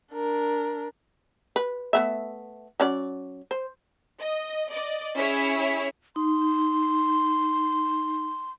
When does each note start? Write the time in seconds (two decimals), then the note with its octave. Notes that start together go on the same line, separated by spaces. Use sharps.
0.13 D4 A#4
1.56 B4
1.93 A3 B3 E5
2.80 F#3 C#4 D5
3.51 C5
4.20 D#5
4.69 D5 D#5
5.15 C#4 E4 G#4 C#5 E5 B6
6.16 D#4 C6